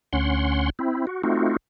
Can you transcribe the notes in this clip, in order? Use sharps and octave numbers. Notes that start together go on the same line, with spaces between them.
D2 C#4 F#5 C6
C4 E4
F#4
A3 C4 D#4 F4 F#4